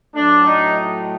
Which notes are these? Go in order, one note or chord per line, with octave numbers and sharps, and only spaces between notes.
A2 F#3 A3 D4
D#4